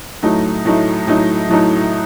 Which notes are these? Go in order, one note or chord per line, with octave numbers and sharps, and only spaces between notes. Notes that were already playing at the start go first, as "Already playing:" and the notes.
A2 F#3 A3 D#4
A2 F#3 A3 D#4
A2 F#3 A3 D#4
A2 F#3 A3 D#4